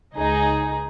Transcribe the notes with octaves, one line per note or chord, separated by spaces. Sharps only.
C#2 D#4 G#4